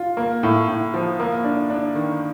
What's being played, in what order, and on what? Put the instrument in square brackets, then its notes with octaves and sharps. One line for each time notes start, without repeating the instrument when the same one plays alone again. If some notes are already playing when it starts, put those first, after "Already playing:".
Already playing: [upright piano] F4
A#3
A2
A2
F3
A#3
D4
D4
D#3